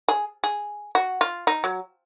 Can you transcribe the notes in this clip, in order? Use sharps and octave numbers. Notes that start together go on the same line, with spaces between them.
G#4
G#4
F#4
F4
D#4
F#3